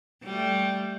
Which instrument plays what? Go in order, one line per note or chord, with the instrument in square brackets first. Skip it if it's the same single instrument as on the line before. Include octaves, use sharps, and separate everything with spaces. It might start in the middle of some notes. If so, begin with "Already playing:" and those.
[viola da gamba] G3 A3